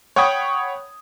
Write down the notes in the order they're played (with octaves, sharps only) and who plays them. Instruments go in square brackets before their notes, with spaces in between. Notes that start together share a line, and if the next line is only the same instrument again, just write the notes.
[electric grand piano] C#5 F#5 G5 B5 D#6 G#6